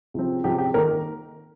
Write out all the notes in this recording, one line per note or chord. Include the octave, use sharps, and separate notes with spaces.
C#2 C3 F3 C4
C#2 C3 F3 C4 G4
G4
D#3 A#3 A#4